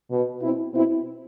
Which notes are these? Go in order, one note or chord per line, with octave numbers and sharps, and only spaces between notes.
B2
B2 C4 E4
B2 C4 E4